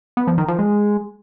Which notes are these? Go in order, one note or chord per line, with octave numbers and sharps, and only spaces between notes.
B3
F3
D#3
F3
G#3